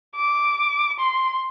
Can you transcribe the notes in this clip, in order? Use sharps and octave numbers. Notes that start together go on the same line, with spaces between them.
D6
C6